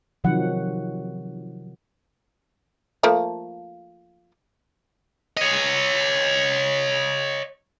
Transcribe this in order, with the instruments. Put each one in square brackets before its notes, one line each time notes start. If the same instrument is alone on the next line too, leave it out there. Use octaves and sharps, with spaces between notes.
[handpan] C3 D#3 F3 F#3 F#5
[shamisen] F3 A3 A#3
[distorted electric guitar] C#5 D#5